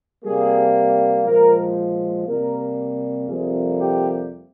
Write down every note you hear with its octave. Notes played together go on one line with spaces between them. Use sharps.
C3 G3 A#3 G#4
A#2 F3 G#3 A#4
C3 G3 A#3 A#4
F2 C3 G3 A#3 G#4
G4